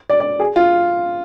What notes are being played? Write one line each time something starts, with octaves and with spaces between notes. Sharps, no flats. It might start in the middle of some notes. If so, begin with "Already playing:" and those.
D5
D5
G#4
F4